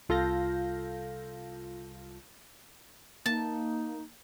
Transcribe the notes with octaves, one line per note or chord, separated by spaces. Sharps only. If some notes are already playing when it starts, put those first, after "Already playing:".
C2 F4 A4 F5 G6 A#6
A#3 D#4 A5